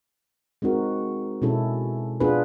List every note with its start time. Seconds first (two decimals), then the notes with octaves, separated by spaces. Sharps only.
0.62 G#3 C4 D#4 F#4 A#4
1.42 B2 G#3 C#4 E4 A4
2.20 B3 D4 F4 G#4 B4